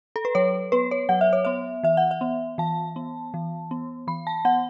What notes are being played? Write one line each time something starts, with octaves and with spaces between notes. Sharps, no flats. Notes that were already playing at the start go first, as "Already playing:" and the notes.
A4
B4
F#3 C#5
B3 B4
C#5
F#3 F#5
E5
C#5
B3 E5
E3 E5
F#5
E5
B3
E3 A5
B3
E3
B3
E3 B5
A5
B3 F#5